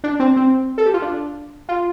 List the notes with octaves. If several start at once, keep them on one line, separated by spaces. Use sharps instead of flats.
D4
C4
C4
A4
G4
F4
D4
F4